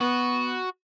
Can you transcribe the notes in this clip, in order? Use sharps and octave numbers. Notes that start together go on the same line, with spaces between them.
B3 F#4